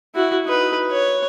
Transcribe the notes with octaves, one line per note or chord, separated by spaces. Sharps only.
E4 F#4
D#4 B4
C#5